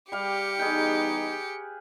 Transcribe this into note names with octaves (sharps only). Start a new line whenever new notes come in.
G3 G4 F5 C#7
E2 G3 D#4 G#4 B4 G5